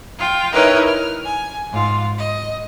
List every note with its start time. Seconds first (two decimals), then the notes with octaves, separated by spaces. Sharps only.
0.19 F4 G5
0.53 D#4 E4 A#4 B4 C#5 D#5
0.86 F6
1.26 G#5
1.73 G#2 F4
2.17 D#5